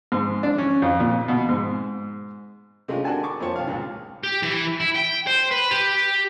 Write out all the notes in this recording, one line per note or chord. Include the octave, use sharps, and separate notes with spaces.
G#2
D4
C#4
F2
A#2
B2
G#2
C3 G#3 A3 C#4 D4 F4
D4 F#4 A4 A#4 G#5 A5
C#6 D6
F2 A#3 F4 C5 C#5 A5
C2 F5
C#2 A#2
G4
E3
E4
G5
C5
B4
G4